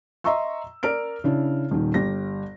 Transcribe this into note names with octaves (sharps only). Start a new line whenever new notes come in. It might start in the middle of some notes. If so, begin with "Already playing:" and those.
D#5 E5 A#5 C6 C#6 E6
A#4 D5 F6 D7
C#3 D4 E4
D#1 D#3
G1 G4 A#6